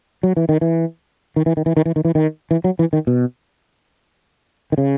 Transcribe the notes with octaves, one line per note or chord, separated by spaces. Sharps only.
F#3
E3
D#3
E3
D#3
E3
D#3
E3
D#3
E3
D#3
E3
D#3
E3
F#3
E3
D#3
B2
D#3
C#3